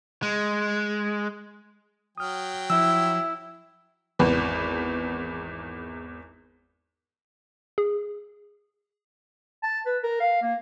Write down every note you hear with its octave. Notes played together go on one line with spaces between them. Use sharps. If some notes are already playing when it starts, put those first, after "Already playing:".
G#3
F#3 G5 D#6 F6
F3 E4 E6
G#1 E2 B4
G#4
A5
B4
A#4
F5
A#3